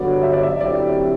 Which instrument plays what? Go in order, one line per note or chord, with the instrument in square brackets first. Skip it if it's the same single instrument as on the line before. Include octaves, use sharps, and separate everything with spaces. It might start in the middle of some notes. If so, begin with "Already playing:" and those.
Already playing: [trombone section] G2 D3 F#3 B3 F#4 [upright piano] D5
[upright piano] E5
D5
E5
[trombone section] D3 F#3 C4 E4 G4 [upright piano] D5